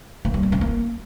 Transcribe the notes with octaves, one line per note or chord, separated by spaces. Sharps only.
A#3
G3
B3
C#4
A#3